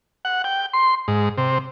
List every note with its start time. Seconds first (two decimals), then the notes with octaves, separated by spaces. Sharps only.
0.25 F#5
0.44 G5
0.73 C6
1.08 G#2
1.38 C3